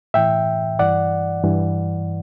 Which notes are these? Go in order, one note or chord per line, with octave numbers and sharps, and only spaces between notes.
A2 E3 E5 G5
G2 E3 D5 F#5
G2 E3